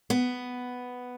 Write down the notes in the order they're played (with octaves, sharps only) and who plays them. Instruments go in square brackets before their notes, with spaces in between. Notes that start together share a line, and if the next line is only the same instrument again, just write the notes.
[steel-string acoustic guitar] B3